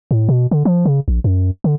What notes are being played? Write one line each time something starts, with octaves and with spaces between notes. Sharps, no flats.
A2
B2
D3
F3
C#3
A#1
F#2
D3